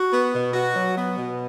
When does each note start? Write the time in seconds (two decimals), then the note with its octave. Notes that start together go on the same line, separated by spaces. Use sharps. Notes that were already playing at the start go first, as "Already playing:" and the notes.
Already playing: F#4
0.12 B3
0.33 B2
0.53 F#4
0.74 F#3
0.96 B3
1.16 B2